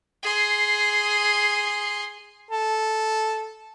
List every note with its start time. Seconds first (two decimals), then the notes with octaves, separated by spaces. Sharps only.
0.23 G#4 C6
2.51 A4